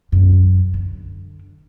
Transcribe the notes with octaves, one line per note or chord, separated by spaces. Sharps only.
F#2 E3
D3